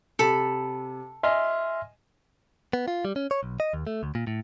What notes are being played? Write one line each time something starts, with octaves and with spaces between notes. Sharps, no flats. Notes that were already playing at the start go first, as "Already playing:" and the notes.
C3 A4 B5
D#5 E5 G#5 C6 F6
B3
F4
G3
C#4
C#5
B1
D#5
D#2
A3
D2
A#2
A2